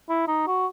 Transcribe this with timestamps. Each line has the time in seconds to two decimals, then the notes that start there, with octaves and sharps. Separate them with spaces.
0.09 E4
0.27 D#4
0.47 F#4